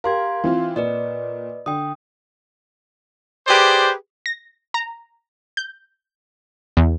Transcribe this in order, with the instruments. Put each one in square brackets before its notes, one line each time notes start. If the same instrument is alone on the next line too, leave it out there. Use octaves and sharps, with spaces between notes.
[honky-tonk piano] G4 A#4 [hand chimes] F5 C6 G#6
[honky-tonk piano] E3 C4 F4
[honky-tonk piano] A#2 [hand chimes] B4 D5 D#5
[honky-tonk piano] D3 [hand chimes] G5 D#6
[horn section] G4 G#4 B4 C5 D5
[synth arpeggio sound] A#6
A#5
G6
E2